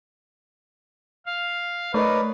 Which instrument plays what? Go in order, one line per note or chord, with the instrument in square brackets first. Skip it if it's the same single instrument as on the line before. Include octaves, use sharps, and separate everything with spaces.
[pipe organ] F5
[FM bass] A3 [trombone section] D#4 B4 [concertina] A#4 C#5 D5